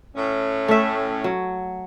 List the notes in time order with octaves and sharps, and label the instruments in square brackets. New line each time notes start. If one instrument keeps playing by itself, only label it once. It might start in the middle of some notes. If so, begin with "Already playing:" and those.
[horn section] A2 C#4
[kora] A3 E5
F#3